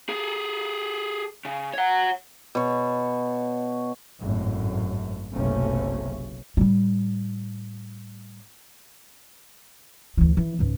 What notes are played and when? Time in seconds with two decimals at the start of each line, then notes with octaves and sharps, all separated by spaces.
0.09 G#4 A4
1.45 C#3
1.74 C#5 F#5
2.55 B2 C#5
4.19 G#1 F#2 A2
5.33 F#1 B1 C3 A3 C#4
6.57 A2 G3
10.17 D2 E3
10.37 E3
10.59 C#2 G#2